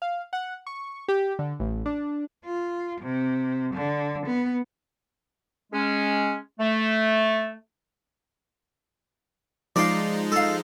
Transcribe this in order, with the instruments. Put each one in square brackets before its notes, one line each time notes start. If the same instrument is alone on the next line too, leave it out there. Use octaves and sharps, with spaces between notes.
[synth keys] F5
F#5
C#6
G4
D3
A1
D4
[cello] F4
C3
D3
B3
[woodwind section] G#3 C#4
A3
[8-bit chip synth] F3 G#3 D#4 [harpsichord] D5 F5
[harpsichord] A4 F5